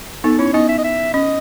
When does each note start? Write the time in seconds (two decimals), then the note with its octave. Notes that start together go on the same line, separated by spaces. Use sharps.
0.24 B3 D#4 A4
0.38 C#4 E4 C#5
0.54 B3 D#4 D#5
0.69 E5
0.78 D#5
0.84 E5
1.13 C#4 D#5